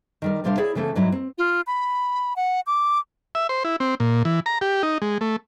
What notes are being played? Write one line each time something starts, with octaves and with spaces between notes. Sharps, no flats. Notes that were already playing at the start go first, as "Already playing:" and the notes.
D#3 G3 A#4
A2 C3 G3 D4 C5 F5
E4 G#4 C#5 D5 F#5
C#3 E3 A3 C4 A4
G#2 F#3 G3 E4
C4
F4
B5
F#5
D6
E5
C5
E4
C4
A#2
E3
A#5
G4
D#4
G#3
A3